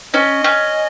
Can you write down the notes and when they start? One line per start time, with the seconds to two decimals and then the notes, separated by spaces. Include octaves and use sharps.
0.13 C#4 D#5
0.44 C#4